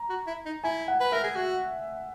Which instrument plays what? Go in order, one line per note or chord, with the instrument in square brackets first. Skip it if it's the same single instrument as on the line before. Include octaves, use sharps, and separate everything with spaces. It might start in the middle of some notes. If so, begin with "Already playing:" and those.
Already playing: [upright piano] A#5
[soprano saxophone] F#4
E4
D#4
[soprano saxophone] E4 [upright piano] G#5
[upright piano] F#5
[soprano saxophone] B4
[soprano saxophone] A#4 [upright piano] E5
[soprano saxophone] G#4
F#4